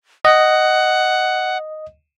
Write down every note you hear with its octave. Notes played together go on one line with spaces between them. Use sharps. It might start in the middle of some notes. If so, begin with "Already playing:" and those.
D#5 F#5